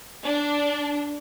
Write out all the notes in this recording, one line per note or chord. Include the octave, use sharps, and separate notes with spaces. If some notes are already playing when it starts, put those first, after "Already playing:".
D4